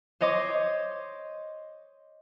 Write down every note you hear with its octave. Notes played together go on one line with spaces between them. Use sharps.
C5 C#5 D#5 C6 D6